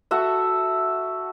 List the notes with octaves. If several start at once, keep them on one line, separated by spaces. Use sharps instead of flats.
F#4 A4 E5 F#5